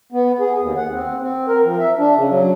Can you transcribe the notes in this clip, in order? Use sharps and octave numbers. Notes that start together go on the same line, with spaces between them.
B3
G#4
D#2
F#5
C4
C4
A#4
F3
E5
D4
C#3
F#3